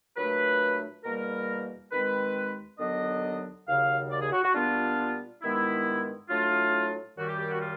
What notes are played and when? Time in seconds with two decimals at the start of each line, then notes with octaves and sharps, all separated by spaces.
0.16 A#2 F#3 A3 D4 B4
1.04 E2 B2 G3 A#3 A#4
1.91 D#2 D#3 G#3 C4 B4
2.78 D#2 D3 F#3 B3 D4 D#5
3.67 D#2 C#3 F#3 F5
4.10 D5
4.22 G#4
4.32 F#4
4.44 F#4
4.54 A#2 G3 B3 D4 F4
5.42 G2 D#3 G#3 B3 E4
6.29 A2 F#3 A3 D4 F4
7.17 F#2 D#3 G3 F#4
7.28 G4
7.39 G4
7.50 F#4
7.61 F4